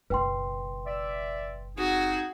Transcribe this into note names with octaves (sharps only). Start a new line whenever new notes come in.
F#1 B1 B4 G5 C6
D5 E5
C4 D#4 F#4 G#4